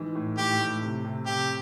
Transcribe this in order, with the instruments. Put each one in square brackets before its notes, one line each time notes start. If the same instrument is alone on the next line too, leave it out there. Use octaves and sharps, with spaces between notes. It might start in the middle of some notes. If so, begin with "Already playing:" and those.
Already playing: [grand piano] G#2 E3
A2
[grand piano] A2 [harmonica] G4
[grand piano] A2
C3
C3
[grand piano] C3 [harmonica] G4